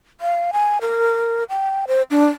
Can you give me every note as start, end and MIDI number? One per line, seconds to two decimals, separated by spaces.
0.21 0.51 77
0.53 0.78 80
0.81 1.44 70
1.50 1.85 79
1.88 2.02 72
2.11 2.27 62